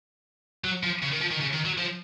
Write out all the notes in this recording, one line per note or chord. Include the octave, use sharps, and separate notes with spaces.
F#3
F3
C#3
D#3
F3
D#3
C#3
D#3
F#3
F3